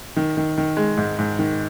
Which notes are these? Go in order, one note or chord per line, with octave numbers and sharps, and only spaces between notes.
D#3
D#3
D#3
G#3
G#2
G#2
D#3